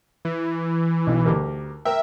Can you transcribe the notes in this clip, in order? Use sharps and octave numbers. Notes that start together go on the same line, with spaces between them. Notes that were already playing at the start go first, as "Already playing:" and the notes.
E3
B1 B2
D2 G4 A#4
A#4 E5 G5